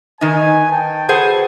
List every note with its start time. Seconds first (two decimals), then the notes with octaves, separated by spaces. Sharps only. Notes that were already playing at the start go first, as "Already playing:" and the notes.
0.21 D#3 D#4 B4 G#5
0.71 G5 A5
1.09 F#4 G#4 A4 B4 C5 F#5